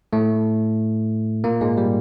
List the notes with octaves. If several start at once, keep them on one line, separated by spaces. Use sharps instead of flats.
A2 A3
A#2 A#3
G#2 G#3
G3